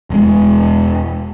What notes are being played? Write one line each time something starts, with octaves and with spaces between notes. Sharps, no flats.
E1 G#3